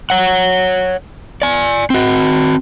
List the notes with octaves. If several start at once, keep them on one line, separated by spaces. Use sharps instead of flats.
C#5 F#5
D5 G#5
C4 F#4